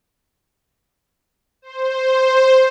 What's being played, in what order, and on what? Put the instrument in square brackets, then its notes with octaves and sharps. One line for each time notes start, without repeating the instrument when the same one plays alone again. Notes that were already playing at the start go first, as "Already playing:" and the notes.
[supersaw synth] C5